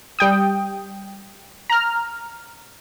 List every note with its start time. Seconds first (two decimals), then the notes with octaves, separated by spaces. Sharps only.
0.19 G3 G5 D#6
1.70 A#5 F6